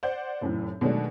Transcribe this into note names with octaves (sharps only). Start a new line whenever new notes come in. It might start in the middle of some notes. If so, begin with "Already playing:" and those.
C5 D5 F#5 G6
F1 F#2 A2
B2 D#3 F#3 G#3 A3 D4